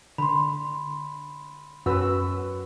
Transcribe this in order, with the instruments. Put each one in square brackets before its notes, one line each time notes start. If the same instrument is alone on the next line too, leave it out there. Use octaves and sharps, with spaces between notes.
[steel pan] D3 [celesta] B5 C6
[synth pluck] F#2 E6 [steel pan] F#4 B4